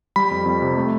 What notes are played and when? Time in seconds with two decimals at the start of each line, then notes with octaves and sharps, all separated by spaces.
0.16 G3 B5
0.31 F2
0.46 F2
0.62 C3
0.77 A3